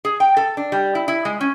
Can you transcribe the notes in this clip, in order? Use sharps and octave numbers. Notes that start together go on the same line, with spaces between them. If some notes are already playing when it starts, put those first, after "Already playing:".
G#4
G5
A4
D4
G3
E4
E4
G#3
C#4